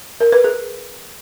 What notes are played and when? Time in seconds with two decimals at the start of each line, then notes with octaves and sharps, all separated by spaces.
0.20 A#4
0.32 B4
0.44 G#4